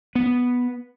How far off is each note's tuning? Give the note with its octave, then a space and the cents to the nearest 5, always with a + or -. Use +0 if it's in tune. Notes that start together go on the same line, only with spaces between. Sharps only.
B3 -5